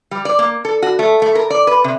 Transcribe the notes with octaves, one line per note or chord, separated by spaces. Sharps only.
G3
D5
A#3
A4
F#4
A3
A3
A#4
D5
B4
C3